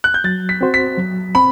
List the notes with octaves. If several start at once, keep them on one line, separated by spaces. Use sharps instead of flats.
F#6
G6
F#3 A6
B6
C4 F#4 C5
B6
F#3
C4 B5